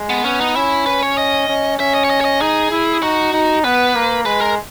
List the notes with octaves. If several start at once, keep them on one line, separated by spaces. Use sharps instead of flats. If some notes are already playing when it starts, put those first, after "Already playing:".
Already playing: G#3
B3
B3 C#4
D#4
C#4 E4
B4
C#5
D#5
C#4
C#4 E5
D#5
C#5
D#5
C#5
D#5
D#4 G#4
E4
D#4 F#4
D#4
B3 B4
A#3
G#3 B4
A#4